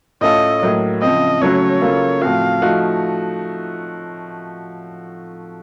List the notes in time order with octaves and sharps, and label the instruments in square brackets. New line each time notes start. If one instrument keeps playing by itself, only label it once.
[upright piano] A2 A3 C#4 F4 A4 [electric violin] D#5
[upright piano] A2 F#3 A#3
[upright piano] C#3 F3 C4 [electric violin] D#5
[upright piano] C#3 F#3 A3 C#4 F#4 [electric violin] C#5
[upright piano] C#3 F#3 A#3 F4 A4
[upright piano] A2 F3 C4 F#4 [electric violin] F5
[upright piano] F3 A3 D#4 F#4